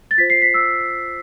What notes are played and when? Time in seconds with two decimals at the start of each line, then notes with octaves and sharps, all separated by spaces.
0.11 A6
0.18 F4 C5 B6
0.30 C7
0.42 B6
0.54 E6